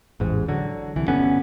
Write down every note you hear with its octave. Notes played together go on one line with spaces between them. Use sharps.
A1 E2 G#2
D3 F#3
C2 E3
G1 D3 B3 C#4